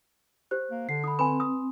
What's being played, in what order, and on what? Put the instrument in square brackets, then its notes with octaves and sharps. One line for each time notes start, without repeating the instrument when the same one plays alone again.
[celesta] G4 C5 F#6
[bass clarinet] A#3
[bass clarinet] D3 [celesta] C7
[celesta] B5 D#6
[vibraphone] C4 [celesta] B4 [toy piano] G#5 B5
[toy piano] D#6